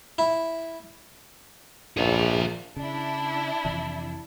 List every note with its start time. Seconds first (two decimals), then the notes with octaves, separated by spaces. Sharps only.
0.18 E4
1.97 A#1 G#4 E5
2.76 C#3 D4 E4
3.65 F2 C3 E3